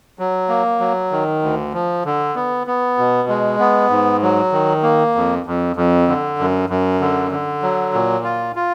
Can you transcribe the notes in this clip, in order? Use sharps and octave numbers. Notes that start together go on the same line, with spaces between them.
F#3
A#3
F#3
D#3
D2
F3
D3
B3
B3
B2
G#3
B3
G#2
F#3
D#3
A#3
F2
F2
F2
D3
F#2
F#2
D3
D3
F#3
A#2
F4
F4